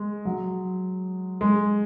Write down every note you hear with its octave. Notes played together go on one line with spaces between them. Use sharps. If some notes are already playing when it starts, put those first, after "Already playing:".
Already playing: G#3
F#3
G#3